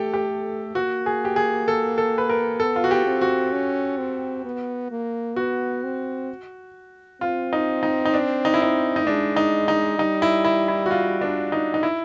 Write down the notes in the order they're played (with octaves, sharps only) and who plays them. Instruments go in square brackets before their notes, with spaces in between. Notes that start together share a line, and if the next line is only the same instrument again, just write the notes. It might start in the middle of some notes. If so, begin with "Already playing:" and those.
Already playing: [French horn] A3 [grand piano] G4 A4
[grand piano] G4
[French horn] A#3 [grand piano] F#4
[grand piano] G#4
G4
G#4
A4
A4
B4
A#4
[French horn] B3 [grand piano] A4
[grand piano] F4
F#4
G4
[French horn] C4
[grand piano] F#4
[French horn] C#4
C4
B3
A#3
[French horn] B3 [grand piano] F#4
[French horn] C4
[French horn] C4 [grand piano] F4
[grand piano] D#4
D#4
D#4
D4
D#4
E4
D#4
D#4
[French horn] G#3 [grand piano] D4
[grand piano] D#4
D#4
[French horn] G3 [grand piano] D#4
[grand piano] E4
E4
E4
F#4
F4
D4
D#4
D#4
E4